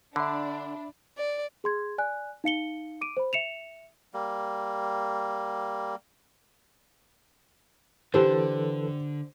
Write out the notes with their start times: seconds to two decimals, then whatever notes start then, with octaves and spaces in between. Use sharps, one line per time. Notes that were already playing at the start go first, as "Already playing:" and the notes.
0.16 D3 D4 E5 B5
1.18 D5
1.64 G#4 C6 G#6
1.98 D5 G#5 F#6
2.44 D#4 F5 C#7 G7
3.01 D6 D7 D#7
3.17 C5 B5
3.33 E5 C#7 E7 F7
4.14 G3 A#3
8.14 D3 E3 G4 A4 B4 C5